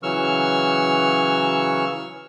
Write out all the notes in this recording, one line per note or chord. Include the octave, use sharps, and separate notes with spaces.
C#3 E3 F#3 C#6 E6 F6